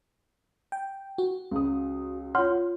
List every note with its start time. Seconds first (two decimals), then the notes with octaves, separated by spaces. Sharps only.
0.72 G5
1.18 F#4
1.51 C#2 D#6
2.35 F4 C#5 F#5 C6 F6